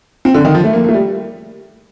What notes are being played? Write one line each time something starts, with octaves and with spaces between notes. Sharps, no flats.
C4
D3
D#3
F3
A3
A#3
A#3
A3
G3